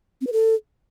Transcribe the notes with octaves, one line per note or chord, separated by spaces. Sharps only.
C4
B4
A4